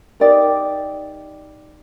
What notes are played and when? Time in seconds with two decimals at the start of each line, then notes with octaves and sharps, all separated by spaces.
0.20 D#4 G4 A#4 D5